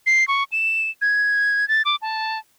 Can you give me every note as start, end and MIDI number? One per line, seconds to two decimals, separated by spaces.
0.06 0.27 96
0.28 0.44 85
0.52 0.90 100
1.01 1.68 92
1.68 1.82 93
1.85 1.96 86
2.02 2.38 81